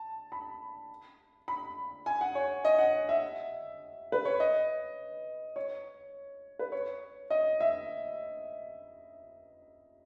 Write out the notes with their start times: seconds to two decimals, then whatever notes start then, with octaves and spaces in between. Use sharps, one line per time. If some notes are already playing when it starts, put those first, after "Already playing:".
Already playing: A5
0.32 B5
1.48 B5
2.06 G#5
2.21 F#5
2.35 C#5
2.65 D#5
2.78 F#5
3.09 E5
4.12 B4
4.25 C#5
4.40 D#5
5.56 C#5
6.59 B4
6.72 C#5
7.30 D#5
7.60 E5